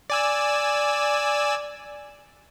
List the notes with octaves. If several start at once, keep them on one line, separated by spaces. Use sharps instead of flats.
D5 G#5 E6